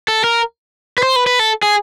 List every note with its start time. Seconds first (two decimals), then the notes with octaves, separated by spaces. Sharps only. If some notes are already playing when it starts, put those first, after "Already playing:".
0.08 A4
0.24 A#4
0.98 B4
1.03 C5
1.16 B4
1.27 B4
1.39 A4
1.63 G#4